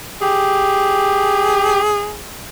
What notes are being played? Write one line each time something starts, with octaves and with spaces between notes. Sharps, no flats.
G4 G#4